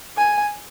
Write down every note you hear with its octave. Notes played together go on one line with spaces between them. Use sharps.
G#5